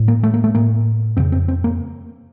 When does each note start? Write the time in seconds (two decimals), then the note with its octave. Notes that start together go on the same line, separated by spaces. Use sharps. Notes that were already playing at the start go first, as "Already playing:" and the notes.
Already playing: A2
0.08 A#3
0.23 A3
0.34 A#3
0.44 A3
0.55 A2 A#3
1.17 F2 C#3 C4
1.32 C4
1.48 C4
1.64 A#3